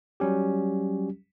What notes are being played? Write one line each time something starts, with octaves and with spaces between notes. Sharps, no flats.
F#3 G3 C#4 G4